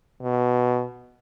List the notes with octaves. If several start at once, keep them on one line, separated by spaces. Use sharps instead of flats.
B2